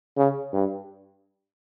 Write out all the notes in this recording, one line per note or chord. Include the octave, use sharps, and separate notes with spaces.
C#3
G2